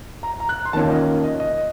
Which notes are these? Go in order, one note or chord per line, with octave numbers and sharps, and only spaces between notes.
A#5
A#5
F#6
C6
D#3 A#3 C#4 F4 A5
D#5
D#5
D#5